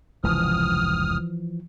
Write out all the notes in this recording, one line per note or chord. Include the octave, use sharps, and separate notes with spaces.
F1 C#2 G2 E3 F3 D#6 F6